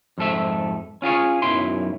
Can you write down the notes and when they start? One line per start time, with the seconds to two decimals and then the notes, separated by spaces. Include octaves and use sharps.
0.18 F2 G#2 A4 E5
1.02 C#4 F4 G#4 C#5
1.42 B1 F#2 F#3 E4 C6